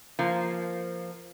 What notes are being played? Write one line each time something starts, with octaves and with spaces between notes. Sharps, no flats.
F3 A#3